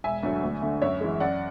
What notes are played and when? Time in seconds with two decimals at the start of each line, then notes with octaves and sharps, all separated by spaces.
0.04 E1 E5 G#5
0.23 D2 D3 F#3 A3
0.43 D2
0.62 D3 A3
0.82 F#2 C#5 E5
1.01 E3 G#3
1.20 F#2 D5 F#5